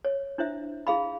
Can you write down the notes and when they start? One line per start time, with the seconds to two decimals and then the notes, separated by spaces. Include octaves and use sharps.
0.05 C#5
0.38 D4 E4 C5 E5
0.87 E4 G#4 F5 B5